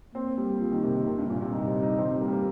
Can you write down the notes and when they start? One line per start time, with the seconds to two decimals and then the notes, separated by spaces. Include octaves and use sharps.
0.14 A#3 C4
0.38 G3
0.61 F3
0.72 D#3
0.83 C3
0.95 D#3
1.06 C3
1.18 G2
1.30 A#2
1.41 C3
1.52 G3 D#4
1.68 C4
1.83 D#4
1.98 D#3 C4
2.10 G3
2.21 A#3
2.28 G3
2.33 A#3